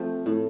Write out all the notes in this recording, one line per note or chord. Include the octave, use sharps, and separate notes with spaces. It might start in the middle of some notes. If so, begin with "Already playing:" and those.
Already playing: F3 A3 C4
A2